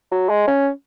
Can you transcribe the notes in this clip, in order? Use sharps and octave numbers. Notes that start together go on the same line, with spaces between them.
F#3
G#3
C#4